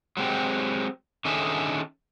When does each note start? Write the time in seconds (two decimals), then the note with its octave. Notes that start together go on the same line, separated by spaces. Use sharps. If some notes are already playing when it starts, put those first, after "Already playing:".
0.17 F#3 G#3 C4 G4
1.25 D3 D#3 C#4 G#4 A4 E5